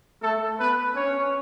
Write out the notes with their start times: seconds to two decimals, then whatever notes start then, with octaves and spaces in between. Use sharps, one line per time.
0.22 A3 A4
0.59 B3 B4
0.95 C#4 C#5